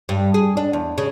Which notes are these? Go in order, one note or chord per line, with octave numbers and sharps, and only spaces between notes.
G2
G#4
D4
E2
C#3